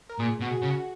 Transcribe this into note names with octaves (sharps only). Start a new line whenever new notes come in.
A#4
A#2 G#4
B2 F#4
G#4
C#3
F#4